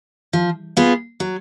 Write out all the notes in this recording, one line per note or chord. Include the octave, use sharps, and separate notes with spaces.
F3
B3 F4 G#4
F#3